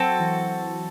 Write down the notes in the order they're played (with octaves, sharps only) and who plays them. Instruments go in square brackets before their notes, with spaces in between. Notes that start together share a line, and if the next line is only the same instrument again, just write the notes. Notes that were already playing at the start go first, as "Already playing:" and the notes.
Already playing: [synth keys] F#3 [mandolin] C4 F#4 A4
[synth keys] E3